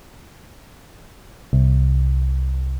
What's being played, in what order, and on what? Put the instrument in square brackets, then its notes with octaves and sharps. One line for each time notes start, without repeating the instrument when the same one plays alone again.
[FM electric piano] C2